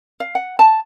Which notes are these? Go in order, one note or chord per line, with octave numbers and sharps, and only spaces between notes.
F5
F#5
A5